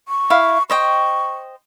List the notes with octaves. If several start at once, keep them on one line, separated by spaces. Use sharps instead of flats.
C#6
E4 F5
C5 D#5 G5 C#6